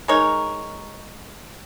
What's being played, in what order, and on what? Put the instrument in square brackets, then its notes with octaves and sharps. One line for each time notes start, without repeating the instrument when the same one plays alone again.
[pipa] G#3 D#4 A#4 C#5